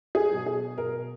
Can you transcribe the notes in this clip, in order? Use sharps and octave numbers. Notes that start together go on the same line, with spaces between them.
G#4
B2 F#3
G#4
B2 A#4